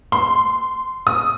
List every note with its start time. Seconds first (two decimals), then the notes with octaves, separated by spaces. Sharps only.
0.12 C6
1.07 D#6